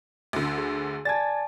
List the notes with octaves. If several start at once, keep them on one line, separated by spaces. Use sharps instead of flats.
D2 D3
G#4
D5 G#5 A5 G#6 A6